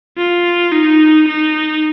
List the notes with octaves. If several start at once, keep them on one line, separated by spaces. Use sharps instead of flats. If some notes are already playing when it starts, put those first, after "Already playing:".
F4
D#4
D#4